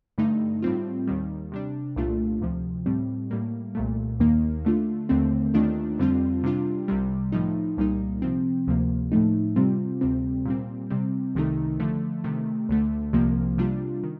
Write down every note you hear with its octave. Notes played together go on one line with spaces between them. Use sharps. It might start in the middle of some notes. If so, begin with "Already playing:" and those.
G2 D3 A3 D#4
A2 G3 C4 F4
D#2 D#3 G3
C3 G3 D4
C2 A#2 A3 D4 F4
D2 C3 F3
A2 G3 C4
A2 G3 A#3
C2 A#2 A3
D#2 D#3 A#3 D#4
D3 A3 D4 F4
D#2 D3 A3 C4
D#2 D#3 A3 D4 F4
F2 D3 G3 C4 F4
C3 G3 D4 F4
C2 C3 G3
A2 F3 A3 D#4
C2 A#2 G3 A#3 D#4
C3 F3 C4
D2 C3 F3 A#3
A2 F3 A3 D#4
C3 G3 C4 F4
D2 C3 G3 C4
A#2 G3 C4
C3 G3 C4
C2 C3 D#3 A3 D#4
D3 F3 A3
C3 D#3 A3
D2 D3 A3
C2 C3 F3 A#3
C3 G3 D4 F4
D#3